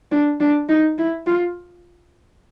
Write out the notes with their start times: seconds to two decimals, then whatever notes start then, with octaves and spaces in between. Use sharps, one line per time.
0.11 D4
0.40 D4
0.69 D#4
0.98 E4
1.27 F4